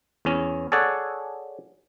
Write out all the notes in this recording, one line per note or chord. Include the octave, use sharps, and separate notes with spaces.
E2 C#4
G#4 A4 C#5 D5 F#5